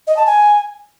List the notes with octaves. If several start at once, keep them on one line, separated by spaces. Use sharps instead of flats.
D#5
A5
G#5